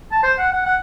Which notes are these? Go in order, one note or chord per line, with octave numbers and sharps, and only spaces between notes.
A5
C5
F#5
F#5
F#5